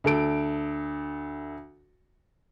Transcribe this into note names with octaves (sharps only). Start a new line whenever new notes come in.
D2 A4 D7